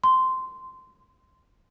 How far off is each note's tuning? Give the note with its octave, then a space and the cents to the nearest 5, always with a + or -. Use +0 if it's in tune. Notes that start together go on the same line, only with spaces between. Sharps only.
C6 -10